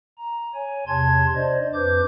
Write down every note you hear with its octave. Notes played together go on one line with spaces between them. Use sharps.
A#5
C#5 G#5
E2 C3 A5 C6 G#6
D4 C5 D5 D#5
F2 D4 B4 D6 G6